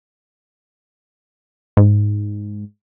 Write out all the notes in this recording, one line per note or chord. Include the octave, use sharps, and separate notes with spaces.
G#2